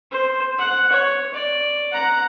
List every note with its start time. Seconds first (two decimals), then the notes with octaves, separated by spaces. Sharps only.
0.11 C5
0.58 F#5
0.92 C#5
1.34 D5
1.91 F#5 A#5